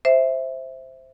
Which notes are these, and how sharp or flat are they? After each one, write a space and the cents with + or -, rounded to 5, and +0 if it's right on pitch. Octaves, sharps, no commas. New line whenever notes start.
C5 +0 E5 +0